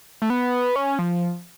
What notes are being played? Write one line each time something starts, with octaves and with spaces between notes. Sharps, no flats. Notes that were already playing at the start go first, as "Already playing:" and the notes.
A3
B3
C#4
F3